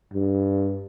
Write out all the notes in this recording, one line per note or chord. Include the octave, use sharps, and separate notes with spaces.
G2